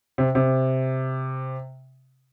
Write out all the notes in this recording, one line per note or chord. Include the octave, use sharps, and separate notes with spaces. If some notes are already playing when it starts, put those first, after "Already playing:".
C3
C3